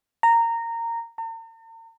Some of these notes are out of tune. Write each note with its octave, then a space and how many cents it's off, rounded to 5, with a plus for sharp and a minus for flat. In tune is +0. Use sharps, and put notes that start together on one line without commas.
A#5 -15
A#5 -45